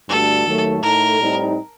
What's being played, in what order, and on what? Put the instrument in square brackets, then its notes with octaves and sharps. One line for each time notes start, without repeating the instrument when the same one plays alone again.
[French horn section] G2 D3 A3 D4 F#4 [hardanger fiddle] A4
[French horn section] D#2 D#3 F#3 A3
[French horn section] A2 A3 D#4 A4 [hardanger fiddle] A#4
[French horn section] A2 G3 C4 D#4